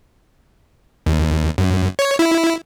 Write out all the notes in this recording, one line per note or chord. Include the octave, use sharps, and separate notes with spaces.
D#2
F#2
C#5
E4